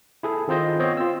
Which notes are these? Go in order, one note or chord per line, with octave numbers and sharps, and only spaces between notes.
E4 G#4 A4
D#3 C4 F4 C5 D#5
B3 C4 C5 C#5 D#5
F4 E6